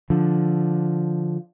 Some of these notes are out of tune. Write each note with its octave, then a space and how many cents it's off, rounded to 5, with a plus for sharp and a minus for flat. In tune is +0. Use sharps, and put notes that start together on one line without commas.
D3 +0 F3 +0